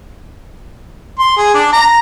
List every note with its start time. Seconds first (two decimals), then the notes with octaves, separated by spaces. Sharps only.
1.19 C6
1.37 G#4
1.54 D4
1.73 A#5